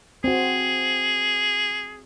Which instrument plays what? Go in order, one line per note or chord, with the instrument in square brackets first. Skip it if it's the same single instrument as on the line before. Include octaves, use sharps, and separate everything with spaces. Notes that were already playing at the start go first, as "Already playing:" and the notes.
[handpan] C4 F#4 [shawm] G#4